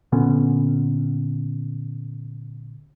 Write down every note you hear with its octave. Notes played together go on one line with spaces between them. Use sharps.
A#2 D3 B3 C#4